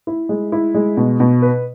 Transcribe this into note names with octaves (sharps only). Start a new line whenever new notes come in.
E4
G#3
E4
G#3
B2
B2
B4